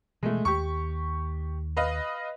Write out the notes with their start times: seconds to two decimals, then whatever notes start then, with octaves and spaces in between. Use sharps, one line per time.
0.23 B2 E3 F3 G#3 A3
0.45 D#2 G4 C#6
1.77 B4 D#5 F5